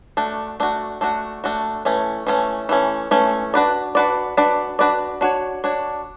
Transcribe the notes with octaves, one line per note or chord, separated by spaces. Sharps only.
A3 D4 F#4
A3 D4 F#4
A3 D4 F#4
A3 D4 F#4
E3 A3 C#4
E3 A3 C#4
E3 A3 C#4
E3 A3 C#4
D4 F#4 B4 D5
D4 F#4 B4 D5
D4 F#4 B4 D5
D4 F#4 B4 D5
D4 F#4 C#5
D4 F#4 C#5